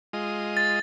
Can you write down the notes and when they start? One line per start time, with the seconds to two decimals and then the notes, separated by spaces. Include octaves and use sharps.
0.13 G#3 F4 D#5
0.57 A6